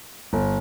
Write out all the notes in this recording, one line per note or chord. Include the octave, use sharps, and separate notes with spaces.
G1